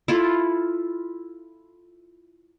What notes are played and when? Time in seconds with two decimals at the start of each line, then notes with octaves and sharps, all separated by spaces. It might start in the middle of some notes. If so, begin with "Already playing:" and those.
0.08 E4 F4 A4